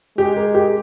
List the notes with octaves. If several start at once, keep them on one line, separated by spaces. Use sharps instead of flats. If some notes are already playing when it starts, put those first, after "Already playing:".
G#3 G4
A#4
G4